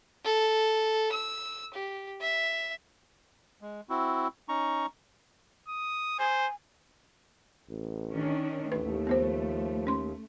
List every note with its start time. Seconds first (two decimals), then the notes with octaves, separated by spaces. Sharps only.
0.25 A4
1.12 E6
1.74 G4
2.21 E5
3.62 G#3
3.89 C4 E4 F#4
4.49 C#4 D#4 A#5 C#6
5.68 D#6
6.19 C5 G#5
7.69 A1
8.11 D#3 C#4 D4
8.72 A1 D#2 A3 B4
9.07 F3 B3 D#4 C5
9.87 C#4 C6